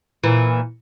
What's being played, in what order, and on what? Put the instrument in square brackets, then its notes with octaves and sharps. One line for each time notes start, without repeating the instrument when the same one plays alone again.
[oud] A#2 E3